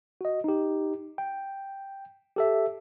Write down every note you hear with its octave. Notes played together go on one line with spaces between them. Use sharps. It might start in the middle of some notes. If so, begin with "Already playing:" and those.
F#4 D#5
D#4 G4
G5
G4 A4 E5